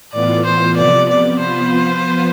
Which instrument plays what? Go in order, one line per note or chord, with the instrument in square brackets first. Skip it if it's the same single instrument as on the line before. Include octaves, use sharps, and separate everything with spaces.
[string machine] A2 E3 B3 F4 [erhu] D5
[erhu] C5
[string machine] C3 F3 B3 [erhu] D5
[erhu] D5
[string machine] F3 B3 F4 B4 [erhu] C5